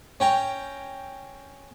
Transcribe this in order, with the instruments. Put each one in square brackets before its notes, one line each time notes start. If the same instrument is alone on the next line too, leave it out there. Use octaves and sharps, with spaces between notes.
[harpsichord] C#4 G5 A#5